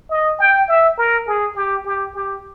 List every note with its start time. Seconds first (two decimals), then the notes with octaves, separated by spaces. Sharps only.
0.10 D#5
0.40 G5
0.69 E5
0.98 A#4
1.28 G#4
1.56 G4
1.86 G4
2.15 G4